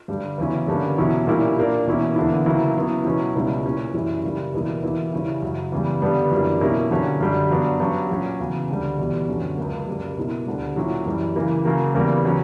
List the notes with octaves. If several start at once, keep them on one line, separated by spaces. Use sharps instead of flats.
G2 D3 G3
E2 C#3 F#3 C#4 E4
G2 D3 A#3 C#4
E2 B2 F#3 C#4 E4
A#2 G3 A#3 C#4 E4
A#2 A#3 D4
E2 B2 A#3 C#4 E4
E2 D3 A#3 E4
C#3 F#3 A#3 E4
C#3 F#3 B3 E4
B2 F#3 C#4 E4
C#2 B2 G3 C#4 E4
A#2 A#3 C#4 E4
F#2 E3 G3 C#4 E4
C#3 G3 A#3 E4
E2 B2 G3 A#3 E4
E2 B2 A#3 E4
C#3 G3 C#4 E4
F#2 C#3 F#3
E2 C#3 G3
G2 D3 G3 B3 D4
F#2 E3 G3 A#3 D4
B2 A#3 C#4 E4
G2 D3 F#3 C#4
F#2 D3 G3
G2 F#3 B3 D4
G2 F#3 C#4
A#2 F#3 C#4
E2 C#3 F#3
D2 D3 G3
E2 B2 G3
F#2 D3 F#3 C#4
C#2 C#3 F#3 A#3
F#2 C#3 G3 A#3
B2 A#3 E4
D2 D3 G3
A#2 F#3 C#4 E4
F#2 E3 G3
C#3 E3 A#3
C#3 F#3 A#3
E2 C#3 G3 A#3
C#3 F#3 C#4